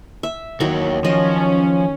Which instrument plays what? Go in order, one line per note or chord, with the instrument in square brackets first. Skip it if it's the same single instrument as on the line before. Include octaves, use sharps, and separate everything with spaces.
[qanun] E5
[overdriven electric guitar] D#2 C#5 [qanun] D#3 F#3 F#5
[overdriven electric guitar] F3 [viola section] C#4 [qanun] D#5